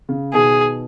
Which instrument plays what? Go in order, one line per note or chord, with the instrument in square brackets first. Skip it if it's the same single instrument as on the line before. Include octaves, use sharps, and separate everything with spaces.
[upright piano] C#3
[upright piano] B2 D#3 [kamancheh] G#4